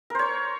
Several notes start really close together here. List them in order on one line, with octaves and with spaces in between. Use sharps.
A#4 C5 C#5